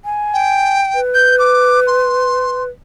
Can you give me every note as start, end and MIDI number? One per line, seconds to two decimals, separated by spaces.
0.05 0.80 80
0.33 1.00 79
0.95 2.68 71
1.14 1.36 91
1.39 1.80 86
1.87 2.63 84